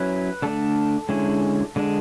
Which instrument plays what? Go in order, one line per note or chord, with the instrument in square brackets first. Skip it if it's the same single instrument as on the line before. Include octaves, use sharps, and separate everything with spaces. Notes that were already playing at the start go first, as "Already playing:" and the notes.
Already playing: [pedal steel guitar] F#3 C#4 E4 B4
D3 A3 D4 A4
D3 G#3 C#4 E4
D3 G#3 D4